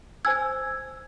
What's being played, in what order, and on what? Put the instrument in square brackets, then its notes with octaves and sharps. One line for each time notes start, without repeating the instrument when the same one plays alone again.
[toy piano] C5 G#5 E6 [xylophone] G#6